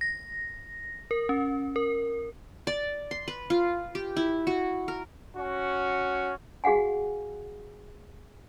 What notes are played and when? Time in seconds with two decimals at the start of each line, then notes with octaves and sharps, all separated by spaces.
0.01 A#6
1.11 A#4
1.29 C#4
1.76 A#4
2.67 D5
3.11 C6
3.28 B4
3.50 F4
3.95 G4
4.17 E4
4.47 F#4
4.88 A#4
5.35 C#4 F#4
6.64 F#4 G#4 F5 F#5 G#5